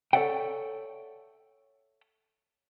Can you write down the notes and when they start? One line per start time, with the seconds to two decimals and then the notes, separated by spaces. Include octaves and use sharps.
0.13 A4 C#5 D5 E5 F#5 G5